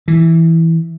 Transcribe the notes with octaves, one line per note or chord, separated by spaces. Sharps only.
E3